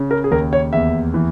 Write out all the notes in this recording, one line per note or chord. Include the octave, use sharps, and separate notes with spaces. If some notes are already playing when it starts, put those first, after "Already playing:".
Already playing: C#3
A#4
G#4
D#2 A#4
C#5
E2 E5
E3